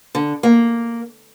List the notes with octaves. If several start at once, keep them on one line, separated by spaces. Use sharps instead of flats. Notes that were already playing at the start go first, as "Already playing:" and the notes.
D3
A#3